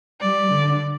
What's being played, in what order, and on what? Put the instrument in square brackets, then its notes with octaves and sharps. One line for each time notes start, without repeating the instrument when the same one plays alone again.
[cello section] G3 [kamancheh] D5
[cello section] D3